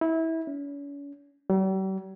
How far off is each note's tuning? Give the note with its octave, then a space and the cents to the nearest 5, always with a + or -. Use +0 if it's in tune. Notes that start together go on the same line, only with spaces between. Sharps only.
E4 -25
C#4 +40
G3 -45